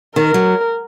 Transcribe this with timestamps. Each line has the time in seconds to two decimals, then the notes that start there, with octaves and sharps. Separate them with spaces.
0.16 D#3 A#4
0.34 F#3